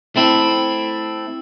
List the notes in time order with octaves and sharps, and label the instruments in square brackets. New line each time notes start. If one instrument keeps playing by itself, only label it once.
[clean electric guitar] A3 C4 E4